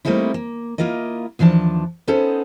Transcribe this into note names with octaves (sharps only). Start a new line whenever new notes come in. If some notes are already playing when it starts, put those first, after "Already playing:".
G3 A3 A#3 C4 D#4 E4
A#3
A#3 E4 F4 A#4 D#5
D#2 E3 F3 D4 A5
B3 C#4 D#4 A4 C5